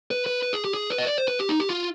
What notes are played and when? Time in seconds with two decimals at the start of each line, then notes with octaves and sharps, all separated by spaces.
0.11 B4
0.26 B4
0.43 B4
0.53 G#4
0.65 G4
0.74 G#4
0.90 B4
0.98 D#5
1.06 D5
1.17 C5
1.28 B4
1.39 G4
1.49 D#4
1.60 G4
1.70 F4